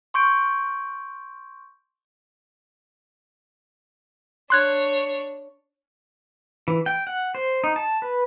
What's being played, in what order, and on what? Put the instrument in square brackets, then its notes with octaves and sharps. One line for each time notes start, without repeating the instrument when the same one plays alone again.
[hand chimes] C6 C#6 G6 D7
[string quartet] D4 C#5 [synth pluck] C6 F#6 G#6
[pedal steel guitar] E3
G5
F#5
C5
D#4
A5
B4